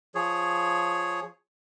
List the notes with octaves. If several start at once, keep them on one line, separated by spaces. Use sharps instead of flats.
F3 G#4 C#5